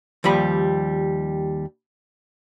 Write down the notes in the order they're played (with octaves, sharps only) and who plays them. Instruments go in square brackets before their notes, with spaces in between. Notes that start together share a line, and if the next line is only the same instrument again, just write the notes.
[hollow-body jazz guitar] D#2 F3 G3 B5